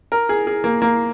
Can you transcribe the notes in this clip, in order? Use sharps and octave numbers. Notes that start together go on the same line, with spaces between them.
A#4
G#4
G#4
A#3
A#3